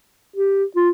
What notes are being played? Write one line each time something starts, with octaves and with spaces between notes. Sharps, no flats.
G4
F4